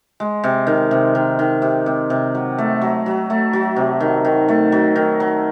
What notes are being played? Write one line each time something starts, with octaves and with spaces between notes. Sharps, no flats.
G#3
C3
D#3
C3
D#3
D#3
C3
C3
C3
F#3
A3
F#3
F#3
A3
F#3
C3
D#3
D#3
A3
F#3
D#3
F#3